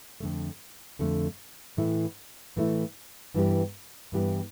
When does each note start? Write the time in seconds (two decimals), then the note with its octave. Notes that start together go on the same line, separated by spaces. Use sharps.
0.20 F2 D3 A3
0.99 F2 D3 A3
1.77 A2 E3 A3 E4
2.56 A2 E3 A3 E4
3.34 G2 E3 B3 E4 G4
4.12 G2 E3 B3 E4 G4